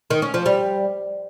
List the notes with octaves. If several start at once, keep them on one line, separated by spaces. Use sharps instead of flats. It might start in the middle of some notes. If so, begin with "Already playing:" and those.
D#3
C#4
F3
G3